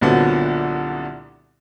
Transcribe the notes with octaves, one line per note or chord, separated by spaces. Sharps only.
C2 A#2 D3 F3 F#3 B3